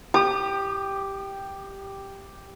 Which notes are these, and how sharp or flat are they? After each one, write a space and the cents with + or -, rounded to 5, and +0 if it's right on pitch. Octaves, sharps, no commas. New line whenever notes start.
G4 +0 D#6 -45